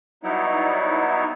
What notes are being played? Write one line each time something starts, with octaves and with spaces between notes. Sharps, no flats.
F#3 G3 B3 D#4 E4